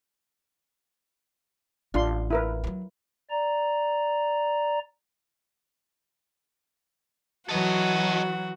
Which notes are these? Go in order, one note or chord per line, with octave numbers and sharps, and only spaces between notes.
A1 D4 F4 C6
E4 A#4 B4
F#3 G3
D5 A#5
E3 F#3 F#4 A4 D#5